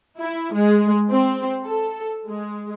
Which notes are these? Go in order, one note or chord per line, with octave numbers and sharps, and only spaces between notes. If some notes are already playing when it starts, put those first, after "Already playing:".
E4
G#3
C4
A4
G#3